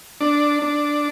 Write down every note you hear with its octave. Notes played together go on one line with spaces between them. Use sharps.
D4
D4